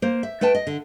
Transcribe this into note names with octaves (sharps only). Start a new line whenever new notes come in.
A#3 C5
E5
A3 B4 G5 A5
D#5
D3